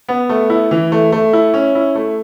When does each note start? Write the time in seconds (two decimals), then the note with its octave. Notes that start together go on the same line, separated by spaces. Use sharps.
0.09 B3
0.29 A3
0.50 E4
0.71 E3
0.92 A3
1.12 A3
1.33 E4
1.54 C#4
1.75 E4
1.95 A3